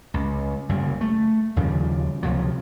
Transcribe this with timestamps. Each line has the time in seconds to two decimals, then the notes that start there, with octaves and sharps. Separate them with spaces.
0.14 C#2
0.69 F#1 C#3 G3
1.01 A3
1.56 D#2 C#3 F3 G3
2.23 C#2 C3 F3 F#3